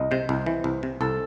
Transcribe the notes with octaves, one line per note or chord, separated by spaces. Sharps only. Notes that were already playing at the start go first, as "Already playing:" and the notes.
Already playing: C2 D#5
C3 C5
C2
E3
C2
C3
C2 A4